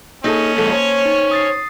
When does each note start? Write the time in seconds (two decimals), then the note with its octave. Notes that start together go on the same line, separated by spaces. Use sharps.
0.24 A#3 C#4 D#4 G#4 A4 A#6
0.58 F2 G#3 A4
0.72 C5 C#5
1.06 D#4
1.31 D#6 A6 C7